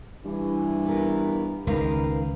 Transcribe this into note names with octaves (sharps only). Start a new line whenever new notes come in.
G2 E3
B3 A#4
C#2 D#3 A#4 B4 F5